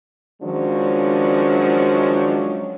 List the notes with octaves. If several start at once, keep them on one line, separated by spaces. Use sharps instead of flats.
D#3 F3 F#3 G#3 C#4 D4